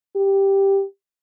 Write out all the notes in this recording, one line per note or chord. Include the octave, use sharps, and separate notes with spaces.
G4